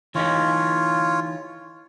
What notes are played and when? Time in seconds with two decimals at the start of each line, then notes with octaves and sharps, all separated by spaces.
0.15 E3 D#4 F4 G4 C#5